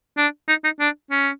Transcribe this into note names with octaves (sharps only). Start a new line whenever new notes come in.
D4
D#4
D#4
D4
C#4